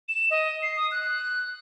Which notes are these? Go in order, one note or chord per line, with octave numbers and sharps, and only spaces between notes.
E7
D#5
C7
D#6
F#6